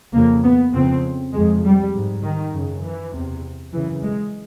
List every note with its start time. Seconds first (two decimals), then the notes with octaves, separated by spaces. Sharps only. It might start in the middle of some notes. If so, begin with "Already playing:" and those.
0.13 F2 C#3 A#3
0.43 B3
0.73 F2 C#3 C4
1.33 F2 C3 G#3
1.64 G3
1.93 G#2
2.23 D#3
2.52 F#2 C#3
2.83 E3
3.12 E2 C3
3.73 F#2 C#3 E3
4.02 G#3